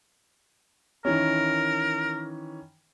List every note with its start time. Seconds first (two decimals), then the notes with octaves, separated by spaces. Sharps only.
1.05 D#3 E3 C#4 A#4